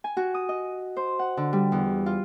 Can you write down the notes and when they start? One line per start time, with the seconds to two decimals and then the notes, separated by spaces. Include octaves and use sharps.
0.04 G#5
0.17 F#4
0.34 D#6
0.49 D#5
0.97 C5
1.19 F#5
1.37 D3
1.53 G3
1.72 E2
2.06 F4